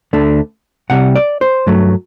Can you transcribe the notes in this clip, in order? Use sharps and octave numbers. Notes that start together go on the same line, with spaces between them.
D2 D3 A3
C2 C3 G3 F#5
D5
C5
G2 F#3 A3